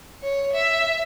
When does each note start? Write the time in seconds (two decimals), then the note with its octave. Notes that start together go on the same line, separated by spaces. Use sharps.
0.22 C#5
0.53 E5